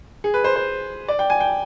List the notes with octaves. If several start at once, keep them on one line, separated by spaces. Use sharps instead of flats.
G#4
B4
C5
C5
D5
G5
G#5
G5